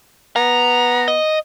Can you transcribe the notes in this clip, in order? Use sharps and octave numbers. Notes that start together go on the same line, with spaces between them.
B3 A#5
D#5